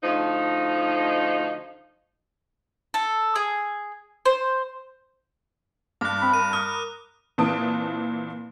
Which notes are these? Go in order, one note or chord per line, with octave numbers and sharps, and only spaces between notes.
D2 F3 D#4
A4
G#4
C5
G2 D6 F#6
C4 B5
A#4 D#7
D#6 F6
A#2 E3 C4 A5 D#6 D7